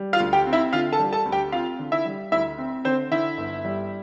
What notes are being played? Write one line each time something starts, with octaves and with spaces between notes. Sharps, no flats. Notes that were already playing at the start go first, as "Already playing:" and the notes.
Already playing: G3
F4 F5
D2
G4 G5
C4
E4 E5
D3 F4 F5
A4 A5
G3
A4 A5
D2
G4 G5
C4 F4 F5
D3
E4 E5
G3
D2 E4 E5
C4
D3 C4 C5
D3 E4 E5
G1
G3